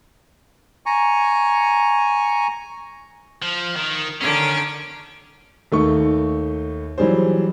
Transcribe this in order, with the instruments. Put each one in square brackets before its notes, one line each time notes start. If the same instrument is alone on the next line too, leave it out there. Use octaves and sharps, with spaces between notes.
[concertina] G#5 A#5 C#6
[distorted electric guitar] F3
D#3
[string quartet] D3 D#3 D6 [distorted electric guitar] C#4
[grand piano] D#2 A3 D#4 C#6
E3 F#3 G3 G#4 C5